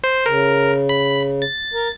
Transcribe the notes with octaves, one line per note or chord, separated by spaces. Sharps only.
C5
C#3 A#4
B5
A6
A#4